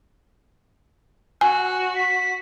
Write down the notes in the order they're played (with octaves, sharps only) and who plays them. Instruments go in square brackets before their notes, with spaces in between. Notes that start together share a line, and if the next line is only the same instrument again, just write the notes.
[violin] F#4 [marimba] G#5 [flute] F#6
[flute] B6